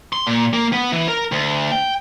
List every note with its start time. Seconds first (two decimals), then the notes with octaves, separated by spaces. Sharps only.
0.13 C6
0.27 A#2
0.53 A#3
0.73 B3
0.92 E3
1.08 A#4
1.32 D2
1.72 G5